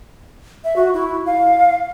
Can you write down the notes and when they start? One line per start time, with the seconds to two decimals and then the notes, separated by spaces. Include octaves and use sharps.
0.64 E5
0.76 F#4
0.94 E4
1.26 F5